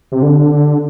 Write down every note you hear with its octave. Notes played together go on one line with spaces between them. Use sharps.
C3
D3